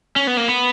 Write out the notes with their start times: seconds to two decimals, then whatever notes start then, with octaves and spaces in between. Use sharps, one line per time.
0.16 C#4
0.27 B3
0.37 A#3
0.49 B3